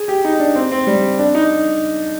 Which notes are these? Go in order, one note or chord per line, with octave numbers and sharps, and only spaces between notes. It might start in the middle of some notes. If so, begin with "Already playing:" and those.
Already playing: G#4
G4
D#4
D4
C4
C4
G3
D4
D#4